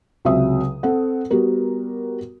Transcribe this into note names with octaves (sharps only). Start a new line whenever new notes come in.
C#2 C3 F#3 E5 D#6
C4 A4 F#5
G3 B3 F#4 A#4